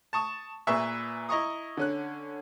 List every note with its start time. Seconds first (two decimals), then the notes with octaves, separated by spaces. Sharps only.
0.13 A5 C#6 D#6
0.67 A#2 G#4 B4 E5 C#6
1.29 E4 D#5 A#5 C#6 D#6
1.77 D3 C#4 F#6